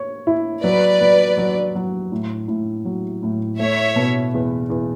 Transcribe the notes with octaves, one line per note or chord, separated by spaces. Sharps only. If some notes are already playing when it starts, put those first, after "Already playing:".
Already playing: C#5
E4
F#3 B4 D5
F#3
F#3
F#3
A2
A2
F#3
A2
A3 C#5 E5
B2
E2
E2